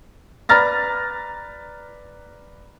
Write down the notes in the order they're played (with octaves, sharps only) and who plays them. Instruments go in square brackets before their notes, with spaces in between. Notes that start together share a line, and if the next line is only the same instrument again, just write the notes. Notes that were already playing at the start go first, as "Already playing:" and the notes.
[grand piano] B4 D5 A#5 F6 A6 A#6